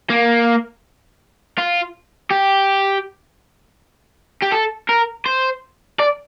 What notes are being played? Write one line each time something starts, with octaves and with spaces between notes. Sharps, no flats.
A#3
F4
G4
G4
A4
A#4
C5
D5